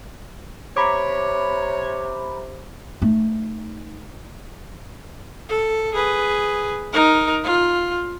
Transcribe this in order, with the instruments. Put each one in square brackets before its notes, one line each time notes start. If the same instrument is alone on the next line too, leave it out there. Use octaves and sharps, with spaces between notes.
[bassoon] C3 [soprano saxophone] C#5 [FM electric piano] A#5 B5 D6
[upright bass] A3 D#4
[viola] A4
G#4 B4
D#4 A#4
F4